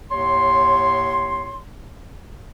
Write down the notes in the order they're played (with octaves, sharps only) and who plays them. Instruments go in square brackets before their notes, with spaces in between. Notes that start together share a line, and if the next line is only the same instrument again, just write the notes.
[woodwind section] D#2 A2 C#5 C6